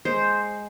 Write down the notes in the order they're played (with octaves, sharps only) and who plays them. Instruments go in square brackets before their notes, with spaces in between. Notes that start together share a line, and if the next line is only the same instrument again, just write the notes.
[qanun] G#3 C5